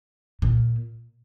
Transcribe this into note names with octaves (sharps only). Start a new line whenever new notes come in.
A#2